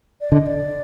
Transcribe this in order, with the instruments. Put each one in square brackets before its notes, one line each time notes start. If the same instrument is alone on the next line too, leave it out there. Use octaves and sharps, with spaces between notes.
[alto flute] D5
[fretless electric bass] D3 [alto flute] D#5
[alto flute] D5